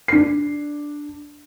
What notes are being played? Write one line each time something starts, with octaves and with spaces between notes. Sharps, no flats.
D4 C7